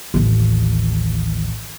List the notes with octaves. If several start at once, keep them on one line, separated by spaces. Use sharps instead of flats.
A1 D#2